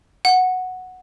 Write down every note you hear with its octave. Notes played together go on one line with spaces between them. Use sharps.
F#5